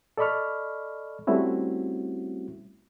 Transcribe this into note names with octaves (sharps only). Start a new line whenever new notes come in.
A4 D5 D#5 B5 C#6 F6
G3 A3 C4 C#4 E4 F#4